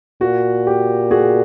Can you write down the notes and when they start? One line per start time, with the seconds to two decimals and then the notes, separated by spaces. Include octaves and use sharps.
0.21 A#2 F#4
0.67 G4
1.11 F#4 G#4